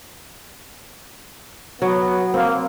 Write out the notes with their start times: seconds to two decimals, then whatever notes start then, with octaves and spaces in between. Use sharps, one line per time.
1.82 F#3 B3
2.34 A#3 C4